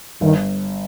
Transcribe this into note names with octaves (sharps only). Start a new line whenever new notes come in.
G1 D#3